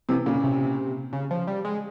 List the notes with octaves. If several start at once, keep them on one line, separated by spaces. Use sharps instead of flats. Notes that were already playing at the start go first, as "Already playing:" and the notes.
C3 E3
A#2 C#3
C3
C#3
F3
G3
G#3